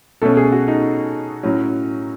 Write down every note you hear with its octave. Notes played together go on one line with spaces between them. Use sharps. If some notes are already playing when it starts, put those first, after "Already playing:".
B2 A3 C#4 A4
G#4
F#4
D#4
A2 F#3 C#4